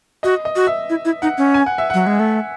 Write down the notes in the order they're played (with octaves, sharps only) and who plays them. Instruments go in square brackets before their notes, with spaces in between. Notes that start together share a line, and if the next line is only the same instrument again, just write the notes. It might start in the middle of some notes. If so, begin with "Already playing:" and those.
[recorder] F#4 [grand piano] D#5
[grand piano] D#5
[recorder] F#4
[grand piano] E5
[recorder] E4
E4
[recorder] D#4 [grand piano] F#5
[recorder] C#4
[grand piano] G#5
F#5
E5
[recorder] F#3 [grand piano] F#5
[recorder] G#3
A3